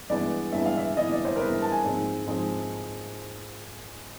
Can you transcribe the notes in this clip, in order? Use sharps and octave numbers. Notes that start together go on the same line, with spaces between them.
G2 E3 G#3 B3 E4 D5
G2 E3 G#3 B3 E4 E5
F5
E5
G2 E3 G#3 B3 E4 D#5
D5
C5
A#4
G2 E3 G#3 B3 E4 B4
A5
G#5
G#2 F3 G#3 C4 D#4
G#2 F3 G#3 C4 D#4